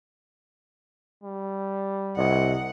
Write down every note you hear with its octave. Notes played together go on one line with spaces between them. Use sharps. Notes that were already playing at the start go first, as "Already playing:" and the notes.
G3
C2 D#5 F#5